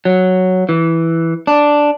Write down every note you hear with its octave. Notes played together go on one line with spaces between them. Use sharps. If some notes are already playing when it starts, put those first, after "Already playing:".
F#3
E3
D4